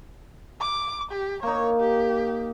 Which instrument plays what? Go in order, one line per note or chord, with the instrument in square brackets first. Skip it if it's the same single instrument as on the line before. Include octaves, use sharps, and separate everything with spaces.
[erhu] D6
G4
[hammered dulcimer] A#3 D#4 [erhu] C#5
[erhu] G4